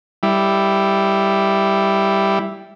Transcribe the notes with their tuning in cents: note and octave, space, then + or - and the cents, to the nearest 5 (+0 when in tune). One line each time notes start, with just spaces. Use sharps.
G3 +0 E4 +0